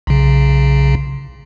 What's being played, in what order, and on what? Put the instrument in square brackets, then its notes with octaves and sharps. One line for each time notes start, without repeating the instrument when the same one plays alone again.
[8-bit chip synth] B1 C#3